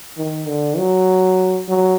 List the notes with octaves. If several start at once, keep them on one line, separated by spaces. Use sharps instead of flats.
D#3
D3
F#3
F#3